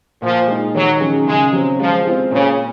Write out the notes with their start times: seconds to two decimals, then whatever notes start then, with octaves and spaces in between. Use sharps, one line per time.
0.22 A#2 F3
0.47 G#3 D#4
0.75 D#3 F#3
1.01 F#3 C#4 G#4
1.26 C#3 G#3
1.53 F#3 C4
1.79 F3 G#3
2.05 C4 F4 G#4
2.31 A#2 C#3